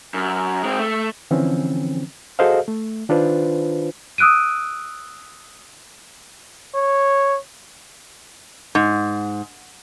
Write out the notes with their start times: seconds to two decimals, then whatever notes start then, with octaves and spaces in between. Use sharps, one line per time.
0.14 F#2
0.63 G#3 C4
0.79 A3
1.31 D3 E3 F3 C4 C#4
2.39 F#4 G#4 A4 C5 D#5 F5
2.68 A3
3.09 D#3 D4 F4 B4 C5
4.18 D#6 E6 F#6 D7 D#7
6.75 C#5
8.75 G#2